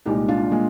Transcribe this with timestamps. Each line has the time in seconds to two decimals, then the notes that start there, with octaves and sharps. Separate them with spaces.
0.06 C2 A#2 G#3 D#4 G4
0.28 D4 F4
0.52 A#2 G#3